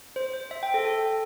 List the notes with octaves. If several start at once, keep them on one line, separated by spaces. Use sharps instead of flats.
C5
C5
E5
G5
A4
A4